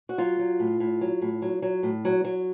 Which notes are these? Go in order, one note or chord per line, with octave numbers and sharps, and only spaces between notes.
F#4
F#3 F4
F#3
A2
A2
F#3
A2
F#3
F#3
A2
F#3
F#3